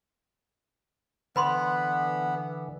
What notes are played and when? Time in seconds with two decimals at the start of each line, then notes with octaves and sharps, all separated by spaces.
1.36 D3 E3 B3 B4 B5 C6